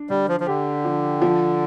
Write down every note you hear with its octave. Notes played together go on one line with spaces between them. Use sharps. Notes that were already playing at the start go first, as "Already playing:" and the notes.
Already playing: D4
D3 G3
F3
F3
D3 G4
F3
F3